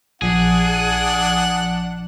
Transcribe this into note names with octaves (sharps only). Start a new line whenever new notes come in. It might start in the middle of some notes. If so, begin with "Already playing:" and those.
A#1 F3 D4 G#4 F#5